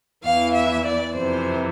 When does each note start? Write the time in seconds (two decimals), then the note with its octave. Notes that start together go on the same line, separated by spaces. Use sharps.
0.24 E2 E3 F5
0.55 E5
0.86 D5
1.15 F2 C3 E3 C5